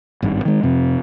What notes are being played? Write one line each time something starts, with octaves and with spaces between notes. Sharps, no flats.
G#1 G2
D#3 G#3
F2 C3